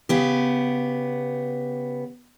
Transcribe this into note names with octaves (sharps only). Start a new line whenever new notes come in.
C#3 B3 G4